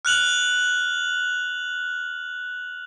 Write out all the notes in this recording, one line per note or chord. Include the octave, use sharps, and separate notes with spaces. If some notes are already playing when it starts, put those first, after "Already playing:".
F6 F#6 F7 F#7